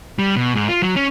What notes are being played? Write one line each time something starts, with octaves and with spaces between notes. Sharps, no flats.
G3
B2
G#2
F4
F#3
C#4